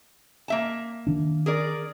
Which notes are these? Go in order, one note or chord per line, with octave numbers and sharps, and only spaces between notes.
A#3 E5 A5
D#3 D4
G#4 A#4 D5